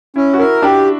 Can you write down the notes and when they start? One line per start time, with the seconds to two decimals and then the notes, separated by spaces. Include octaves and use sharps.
0.16 C#4 E4
0.34 F#4
0.39 E4 A#4
0.62 D4 G4